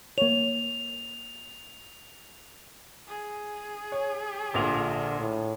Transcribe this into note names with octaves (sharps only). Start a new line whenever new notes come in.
A#3 C#5 F7
G#4
C#5
A#1 A#2 D3 F7
A2